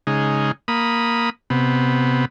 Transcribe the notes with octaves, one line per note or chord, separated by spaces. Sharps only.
C#3 G#3 D#4
A#3 B5 D#6
C3 B3